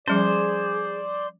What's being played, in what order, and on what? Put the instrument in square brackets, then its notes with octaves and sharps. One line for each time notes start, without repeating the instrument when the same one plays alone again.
[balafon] F3 G3 C#4 [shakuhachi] G#4 [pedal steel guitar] C5 [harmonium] D5